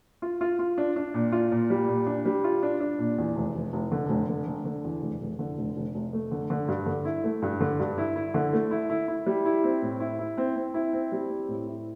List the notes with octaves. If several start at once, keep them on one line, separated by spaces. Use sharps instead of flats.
F4
F4
F4
D4
D4
A#2
F4
A#2
G3
A#2
D4
G3
F4
D4
D4
A#2
E2
F1
F1
F1
D3
F1
D3
D3
D3
E2
F1
F1
D3
F1
F1
F1
A3
D3
D3
G2
D3
E4
A3
G2
D3
G2
E4
E4
D3
A3
E4
E4
E4
G3
E4
C4
A2
E4
E4
C4
C4
E4
C4
G3
C4
A2
E4